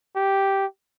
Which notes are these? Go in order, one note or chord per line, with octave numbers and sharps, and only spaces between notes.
G4